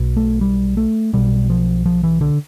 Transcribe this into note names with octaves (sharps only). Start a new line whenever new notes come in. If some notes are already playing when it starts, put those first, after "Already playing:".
Already playing: B1 B2
A3
G3
A3
B1 B2 G3
F3
F3
E3
D3